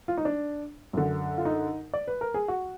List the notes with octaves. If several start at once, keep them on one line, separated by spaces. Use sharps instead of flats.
F4
D#4
D4
F#2 D3
F4
D#4
D5
B4
A#4
G#4
F#4